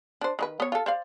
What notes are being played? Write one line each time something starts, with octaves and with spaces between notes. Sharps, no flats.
D4 C5
D#3 E4 B4
B3 C#5
F4 A4
C5 D5 F5